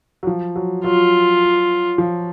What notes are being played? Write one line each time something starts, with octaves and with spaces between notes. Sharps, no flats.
F#3
F3
F#3
F#3 F4
F3